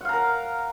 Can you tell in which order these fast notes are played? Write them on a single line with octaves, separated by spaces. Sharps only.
F#5 F5 A#5 A#4